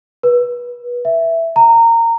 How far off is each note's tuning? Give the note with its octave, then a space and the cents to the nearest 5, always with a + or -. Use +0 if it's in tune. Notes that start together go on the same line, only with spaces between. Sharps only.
B4 -25
E5 +5
A#5 -20